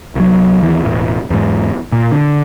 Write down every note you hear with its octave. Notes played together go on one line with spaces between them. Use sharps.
C2 F#3
D#2 E3
E1 A1
E2 G#2
A#2
D3